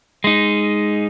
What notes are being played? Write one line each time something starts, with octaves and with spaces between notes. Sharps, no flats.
G#3 D#4